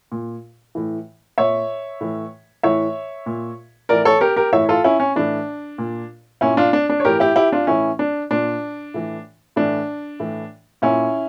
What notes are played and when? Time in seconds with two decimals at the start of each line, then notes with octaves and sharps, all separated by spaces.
0.12 A#2
0.75 A2 E3
1.38 A#2 C#5 E5
2.01 A2 E3
2.63 A2 E3 C#5 E5
3.26 A#2
3.89 A2 E3 A#4 D5
4.05 A4 C#5
4.21 G4 A#4
4.36 G4 A#4
4.53 A2 E3 C#5 E5
4.69 F4 A4
4.84 C#4 E4
5.00 C#4
5.16 A2 E3 D4
5.78 A#2
6.41 A#2 C#4 E4
6.57 D4 F4
6.73 D4
6.90 D4
7.00 C#5
7.05 A2 E3 G4 A#4
7.20 E4 G4
7.36 E4 G4
7.52 D4 F4
7.67 A2 E3 C#4 E4
7.99 D4
8.31 A#2 D4
8.94 A2 E3
9.56 A2 E3 D4
10.20 A2 E3
10.82 A#2 C#4 E4